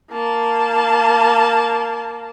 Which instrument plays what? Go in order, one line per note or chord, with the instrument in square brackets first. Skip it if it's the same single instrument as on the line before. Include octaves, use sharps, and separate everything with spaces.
[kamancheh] A#3 A5